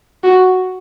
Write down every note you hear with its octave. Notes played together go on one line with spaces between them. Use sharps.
F#4